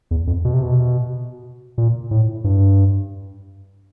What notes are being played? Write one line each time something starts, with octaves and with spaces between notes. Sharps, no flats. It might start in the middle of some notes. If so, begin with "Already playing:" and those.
E2
F2
B2
C3
B2
A#2
A2
G2